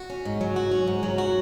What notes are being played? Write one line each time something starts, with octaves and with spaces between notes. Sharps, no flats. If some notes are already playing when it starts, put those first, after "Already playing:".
Already playing: F#4
C#4
G#2
F#3
F#4
C#4
G#2
F#3
F#4